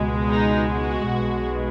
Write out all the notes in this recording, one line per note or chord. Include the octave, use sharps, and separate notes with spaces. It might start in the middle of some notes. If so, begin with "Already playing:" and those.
Already playing: C#2 B2 G#3
D#4
F#4
B1 B2 G#3